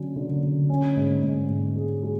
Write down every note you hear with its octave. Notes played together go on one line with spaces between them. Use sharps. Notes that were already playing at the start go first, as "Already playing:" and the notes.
Already playing: D3 F#3 C#4
D3
D3
C#4
G#2
G#2
G#2
G#4
G#3